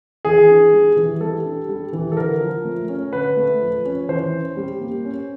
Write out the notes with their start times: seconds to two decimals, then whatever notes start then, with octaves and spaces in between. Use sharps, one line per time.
0.25 E3 G#4
0.49 D4
0.73 G3
0.97 E3
1.21 G3 A4
1.45 D4
1.69 G3
1.93 E3
2.12 A4
2.17 D3 A#4
2.41 F3
2.65 A3
2.89 C#4
3.13 D3 B4
3.37 A3
3.61 F3
3.85 C#4
4.09 E3 C5
4.32 C#4
4.57 G3
4.81 A#3
5.05 C#4